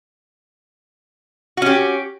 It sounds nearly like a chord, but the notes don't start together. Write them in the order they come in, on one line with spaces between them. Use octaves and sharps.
F#4 C#4 G4